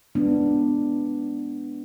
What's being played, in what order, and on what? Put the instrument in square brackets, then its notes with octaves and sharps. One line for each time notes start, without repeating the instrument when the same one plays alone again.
[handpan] G#3 B3 D4